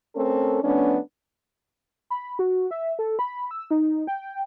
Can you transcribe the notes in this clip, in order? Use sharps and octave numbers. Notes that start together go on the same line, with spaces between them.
A3 C4 C#4 A4 A#4
F3 A3 B3 C#4 D4
B5
F#4
E5
A4
B5
E6
D#4
G5